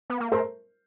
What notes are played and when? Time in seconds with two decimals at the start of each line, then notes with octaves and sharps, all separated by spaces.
0.10 B3
0.20 A#3
0.32 A3 A#4 C5